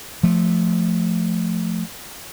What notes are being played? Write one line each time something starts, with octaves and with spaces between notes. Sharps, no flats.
F3 A3